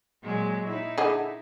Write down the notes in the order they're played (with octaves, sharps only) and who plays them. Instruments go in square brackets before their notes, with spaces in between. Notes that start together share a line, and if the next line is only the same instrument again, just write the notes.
[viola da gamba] A#2 F#3 G#3
D#4 E4
[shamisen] D3 G#4 D#5